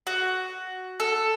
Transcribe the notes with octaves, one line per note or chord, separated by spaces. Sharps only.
F#4
A4